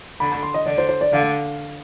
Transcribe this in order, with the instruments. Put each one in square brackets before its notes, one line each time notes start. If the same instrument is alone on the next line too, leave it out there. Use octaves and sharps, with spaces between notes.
[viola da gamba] D3 [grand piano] B5
[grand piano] B5
C6
D#5
[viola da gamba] D3 [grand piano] D5
[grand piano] C5
C5
D5
[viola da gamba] D3 [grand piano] F5